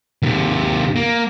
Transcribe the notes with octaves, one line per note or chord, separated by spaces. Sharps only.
D#2 C3
A#3